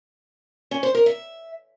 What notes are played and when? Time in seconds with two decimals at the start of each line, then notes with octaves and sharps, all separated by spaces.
0.71 C#4
0.83 C5
0.95 A#4
1.06 E5